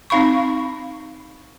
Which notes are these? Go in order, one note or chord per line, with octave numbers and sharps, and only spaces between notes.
C4 D#4 F5 B5 C#6